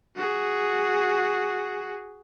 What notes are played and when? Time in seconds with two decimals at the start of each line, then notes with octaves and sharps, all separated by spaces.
0.16 F#4 G#4